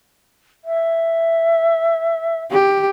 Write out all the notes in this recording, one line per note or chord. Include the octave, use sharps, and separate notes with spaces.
E5
G4